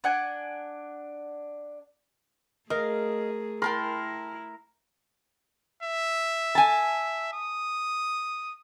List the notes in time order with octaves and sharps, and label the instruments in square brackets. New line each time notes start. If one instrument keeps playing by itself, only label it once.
[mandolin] D4 F#5 G#5
[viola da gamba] A3 G#4 [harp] A#4 [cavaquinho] D#5 F5
[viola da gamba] E4 [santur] A#4 [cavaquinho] G5 A5 B5 [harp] C6
[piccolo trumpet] E5
[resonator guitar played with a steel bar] G#5 A5
[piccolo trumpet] D#6